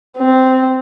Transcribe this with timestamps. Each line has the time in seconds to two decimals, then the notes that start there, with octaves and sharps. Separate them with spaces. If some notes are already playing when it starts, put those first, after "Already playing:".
0.17 C4